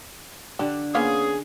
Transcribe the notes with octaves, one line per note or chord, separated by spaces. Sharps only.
D3 D4 G4
A#3 B3 C#4 F4 G#4